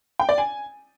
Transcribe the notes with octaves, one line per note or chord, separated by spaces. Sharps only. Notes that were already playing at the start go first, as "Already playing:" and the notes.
G5
D5
G#5